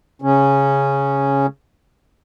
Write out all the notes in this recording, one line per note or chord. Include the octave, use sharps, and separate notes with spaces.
C#3 C#4